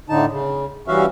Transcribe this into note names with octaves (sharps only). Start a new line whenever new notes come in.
A2 D3 D#4 A5
C#3
G2 E3 C#4 F#4 E5 F5